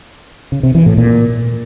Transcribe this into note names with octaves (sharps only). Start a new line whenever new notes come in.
C#3
C3
E3
A2
A#2